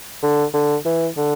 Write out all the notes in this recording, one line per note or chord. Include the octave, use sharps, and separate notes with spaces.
D3
D3
E3
D3